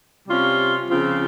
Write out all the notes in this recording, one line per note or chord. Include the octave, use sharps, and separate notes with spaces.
C3 G3 C#4 F4
C#3 F3 C4 F4